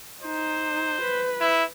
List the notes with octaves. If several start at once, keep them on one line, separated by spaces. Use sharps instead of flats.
D#4 C5
B4
E4